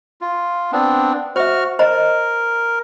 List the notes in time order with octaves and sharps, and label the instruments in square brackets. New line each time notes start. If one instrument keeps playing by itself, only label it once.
[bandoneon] F4
B3 C4 D4
[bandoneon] F#4 C#6 F6 [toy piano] C5 E5
[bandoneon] A#4 [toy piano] C5 D#5 A#5